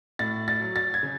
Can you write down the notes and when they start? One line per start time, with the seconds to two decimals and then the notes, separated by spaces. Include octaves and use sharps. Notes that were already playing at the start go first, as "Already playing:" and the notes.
0.19 A2 A6
0.48 A6
0.61 F#3
0.76 A6
0.94 G#6
1.03 C#3